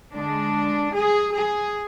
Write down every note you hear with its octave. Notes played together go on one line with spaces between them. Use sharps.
D3 G#3 D4
G#4
G#4